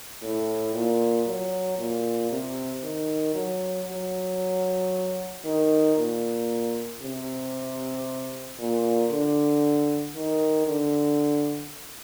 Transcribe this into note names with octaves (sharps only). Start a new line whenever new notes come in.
A2
A#2
F#3
A#2
C3
D#3
F#3
F#3
D#3
A#2
C3
A#2
D3
D#3
D3